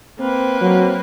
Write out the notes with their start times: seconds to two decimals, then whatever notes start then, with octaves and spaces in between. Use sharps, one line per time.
0.19 A#3 C4 B4
0.62 F#3 C4